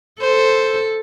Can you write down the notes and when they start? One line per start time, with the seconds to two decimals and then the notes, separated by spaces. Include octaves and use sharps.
0.21 A4 C5